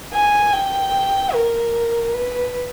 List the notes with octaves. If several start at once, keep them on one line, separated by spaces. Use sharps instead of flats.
G#5
G5
A#4
B4